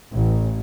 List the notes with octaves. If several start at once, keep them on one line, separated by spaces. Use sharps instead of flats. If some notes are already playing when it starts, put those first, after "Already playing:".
A1